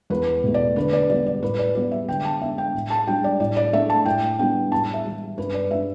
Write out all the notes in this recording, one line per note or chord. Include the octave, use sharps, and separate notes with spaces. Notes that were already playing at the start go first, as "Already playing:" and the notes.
E2 B4
B2 A3
D5
D3 B4
D5
G3 B3 D5
D5
A2 B4
D5
G3 B3 D5
E5
D3 G5
A5
B3 D4 E5
G5
A2
A5
G3 D4 G5
D5
A2 D5
D5
A3 D4 E5
A5
A2 G5
G3 B3 D4 G5
A2 A5
E5
E3 G3
G2 B4
D5
G3 D4 E5